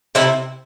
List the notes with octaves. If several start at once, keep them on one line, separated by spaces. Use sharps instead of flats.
C3 C4 E4